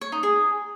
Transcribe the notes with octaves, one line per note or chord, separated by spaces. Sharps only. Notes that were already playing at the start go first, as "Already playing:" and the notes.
C#5
D#4
G#4